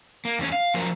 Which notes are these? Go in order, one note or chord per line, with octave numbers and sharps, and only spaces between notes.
A#3
E2 C#4 C#5
F5
F3 F#3 A#3 A#4 C5